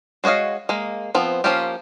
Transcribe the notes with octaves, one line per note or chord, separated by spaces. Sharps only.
G#3 F#4 C#5 D#5 F5
G#3 A#3
F3 B3 C4
F3 A#3 C#4 F4 G4